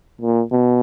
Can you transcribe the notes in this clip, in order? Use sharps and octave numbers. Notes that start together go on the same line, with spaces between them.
A#2
B2